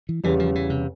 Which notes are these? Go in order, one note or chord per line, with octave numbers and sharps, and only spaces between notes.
E3
E2 C#3 E3 G3
F3
E3
C3